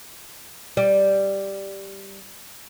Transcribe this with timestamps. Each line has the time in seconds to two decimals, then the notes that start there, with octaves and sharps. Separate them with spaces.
0.77 G3 D5